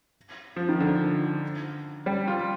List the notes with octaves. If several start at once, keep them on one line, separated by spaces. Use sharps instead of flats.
F3
D#3
D3
G3
F4